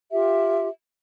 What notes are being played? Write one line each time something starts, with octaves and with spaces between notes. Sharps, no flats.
F4 G4 E5